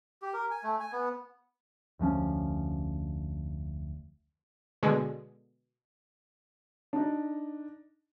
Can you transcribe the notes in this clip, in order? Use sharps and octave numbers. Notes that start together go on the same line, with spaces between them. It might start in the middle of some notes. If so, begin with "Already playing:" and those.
G4
A#4
G#5
A3
G#5
B3
F1 D2 F3 C#4
B2 D3 G#3 G#4
D4 D#4